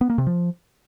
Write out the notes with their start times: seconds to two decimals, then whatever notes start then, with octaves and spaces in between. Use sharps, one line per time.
0.01 B3
0.10 A#3
0.18 C3
0.27 F3